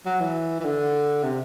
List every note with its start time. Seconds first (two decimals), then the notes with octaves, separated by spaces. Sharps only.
0.06 F#3
0.20 E3
0.60 E3
0.65 D3
1.23 C3